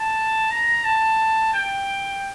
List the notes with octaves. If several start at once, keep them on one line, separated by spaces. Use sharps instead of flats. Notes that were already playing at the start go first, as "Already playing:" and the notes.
Already playing: A5
A#5
A5
G5